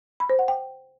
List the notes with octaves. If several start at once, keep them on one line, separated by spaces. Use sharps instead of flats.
B5
C5
F#5
G5